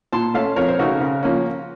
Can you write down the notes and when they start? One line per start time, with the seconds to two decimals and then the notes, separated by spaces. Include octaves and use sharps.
0.13 A#2 A5 C6
0.34 A3 C#4 F5 A5
0.56 F2 A#4 C#5
0.68 C5
0.79 C#3 A3 D#4 F#4 A#4
1.00 C#3
1.23 F3 A#3 C#4